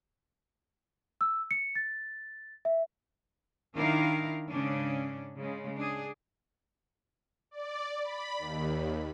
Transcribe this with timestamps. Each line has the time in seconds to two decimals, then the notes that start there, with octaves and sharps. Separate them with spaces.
1.21 E6
1.51 C#7
1.75 A6
2.65 E5
3.76 D#3 D4 E4 A#4 F5
4.51 G#2 C#3 C#4 D4
5.39 C#3 G#3
5.78 D4 G#4
7.51 D5
8.02 B5
8.38 D#2